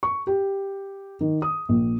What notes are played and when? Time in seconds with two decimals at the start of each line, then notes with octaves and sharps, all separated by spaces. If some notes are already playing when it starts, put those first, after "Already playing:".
0.03 C#6
0.27 G4
1.21 D#3
1.42 D#6
1.69 A#1